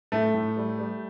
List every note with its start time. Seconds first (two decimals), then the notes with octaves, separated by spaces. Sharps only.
0.12 A2 A3
0.34 A2
0.57 G3
0.79 G3